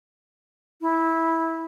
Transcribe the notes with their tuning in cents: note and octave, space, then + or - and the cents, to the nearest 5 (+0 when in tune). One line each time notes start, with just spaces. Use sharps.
E4 -15